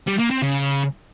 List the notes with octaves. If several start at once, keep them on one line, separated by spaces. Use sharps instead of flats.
G3
A#3
C4
C#3